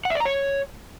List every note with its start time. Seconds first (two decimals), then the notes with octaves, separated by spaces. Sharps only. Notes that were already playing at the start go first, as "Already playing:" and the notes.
0.05 F#5
0.10 E5
0.15 D5
0.20 A#5
0.25 C#5